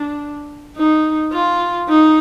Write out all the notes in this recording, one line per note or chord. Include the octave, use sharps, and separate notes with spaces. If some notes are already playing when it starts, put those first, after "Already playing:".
Already playing: D4
D#4
F4
D#4